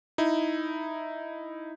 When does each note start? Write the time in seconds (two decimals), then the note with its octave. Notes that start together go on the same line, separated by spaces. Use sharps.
0.18 D#4 E4